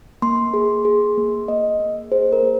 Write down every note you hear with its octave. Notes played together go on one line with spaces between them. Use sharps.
A#3 C6
G#4
G#4
A#3
A#3 D#5
A#3
G#4 C5
A#4
A#3